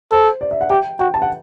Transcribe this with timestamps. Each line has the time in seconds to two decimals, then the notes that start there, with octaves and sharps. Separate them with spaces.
0.12 A4 C5
0.41 D5
0.51 E5
0.61 F#5
0.70 G4 G5
0.99 F#4 G5
1.14 A5
1.22 F#5